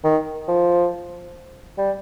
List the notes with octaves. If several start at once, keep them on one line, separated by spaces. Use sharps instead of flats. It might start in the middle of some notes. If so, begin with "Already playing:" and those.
D#3
F3
G3